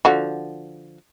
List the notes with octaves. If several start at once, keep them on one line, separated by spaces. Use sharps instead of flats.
D3 F3 F#4